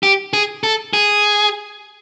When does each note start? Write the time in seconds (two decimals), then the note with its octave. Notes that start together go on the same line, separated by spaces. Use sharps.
0.03 G4
0.33 G#4
0.63 A4
0.93 G#4